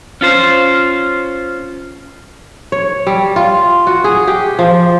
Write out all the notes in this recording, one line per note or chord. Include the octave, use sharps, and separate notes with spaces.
C#4 F4 C5
C#5
G3
F4
F#4
G#4
G4
F3